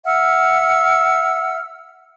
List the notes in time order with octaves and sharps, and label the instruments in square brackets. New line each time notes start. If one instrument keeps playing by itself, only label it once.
[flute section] E5 F#5 E6 F6